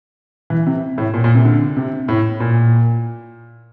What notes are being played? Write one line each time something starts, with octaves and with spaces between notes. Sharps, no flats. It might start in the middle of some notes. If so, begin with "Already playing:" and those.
E3
C3
A2
A#2
A#2
C3
D3
C3
A2
A#2